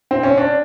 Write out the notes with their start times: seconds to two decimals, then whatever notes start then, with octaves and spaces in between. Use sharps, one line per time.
0.11 C4
0.23 C#4
0.38 D4